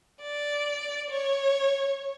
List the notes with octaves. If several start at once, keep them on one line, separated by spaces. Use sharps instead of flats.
D5
C#5